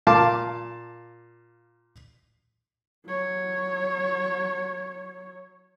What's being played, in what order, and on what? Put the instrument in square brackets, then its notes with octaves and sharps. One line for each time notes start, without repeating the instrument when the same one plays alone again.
[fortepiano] A#2 F5 A5 D6
[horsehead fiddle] F#3 C#5